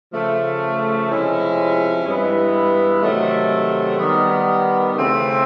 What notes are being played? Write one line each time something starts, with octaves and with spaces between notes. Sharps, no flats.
C#3 F3 A3
C3 F3 G#3 C#4 E4
G2 E3 G#3 B3 E4
C3 D#3 F#3 A3
D#3 G3 B3
C#3 E3 A3 C4